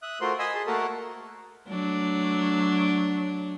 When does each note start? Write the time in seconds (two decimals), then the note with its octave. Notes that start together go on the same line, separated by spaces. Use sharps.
0.02 E5 D#6 F#6
0.21 A3 F4 F#4 A#4 C5 C6
0.39 D#5 G#5 B5 C6 D#6 E6
0.54 G#4 A5 C6
0.67 A3 A#3 F#4 A4 A#4 A5
1.69 F#3 A3 D4